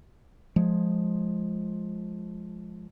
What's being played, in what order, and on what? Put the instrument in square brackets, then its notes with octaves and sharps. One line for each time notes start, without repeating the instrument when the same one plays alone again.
[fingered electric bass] F3 G#3